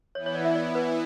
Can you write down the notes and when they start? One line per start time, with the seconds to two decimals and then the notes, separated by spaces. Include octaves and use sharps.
0.15 E3 B3 E4 C#5
0.26 C#5
0.35 D5
0.45 E5
0.55 D5
0.75 B4